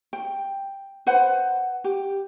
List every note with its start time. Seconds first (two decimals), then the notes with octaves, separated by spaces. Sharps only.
0.13 G5
1.07 B4 C5 F#5
1.84 G4